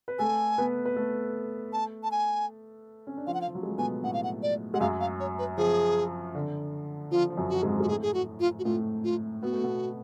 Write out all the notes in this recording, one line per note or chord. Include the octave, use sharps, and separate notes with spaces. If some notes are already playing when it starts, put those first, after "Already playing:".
B4
A3 A4 G#5
B3 B4
B4
A3 A4
A5
A5
G#5
C#4
D4
F3 F4 F5
F#5
F5
F3
F#3
G#3
A3
B2 B3 G#5
A2 A3 F#5
F5
F#5
D5
G#3 F#5
F#2 F#3 F5
F5
C#5
B4
F3 G#4
D3
F3 F4
F3
F#2 F#3
F#4
G#2 G#3
G#3 F#4
A2 A3 G#4
G#4
F#4
F4
F#4
A2 A3 F4
F4
B3 F#4
A3
B2 B3